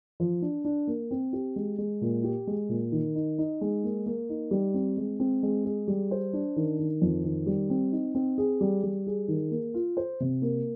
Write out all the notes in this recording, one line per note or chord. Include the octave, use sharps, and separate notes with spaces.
F3
D4
D4
A#3
C4
G4
G#3
G#3
A#2
G4
G#3
A#2
D#3
D#4
D#4
G#3
A#3
A#3
D#4
G3
C4
G#3
C4
G#3
G#4
G3
C5
D4
D#3
D#3
F2
D#3
G3
C4
D#4
C4
G#4
G3
G3
G#4
D#3
A#3
F4
C5
C3
A#3